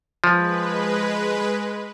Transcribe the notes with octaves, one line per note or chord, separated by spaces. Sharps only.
F3 G#3 B4